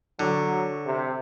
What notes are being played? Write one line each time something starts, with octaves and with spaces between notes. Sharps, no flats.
D3 F#3
C3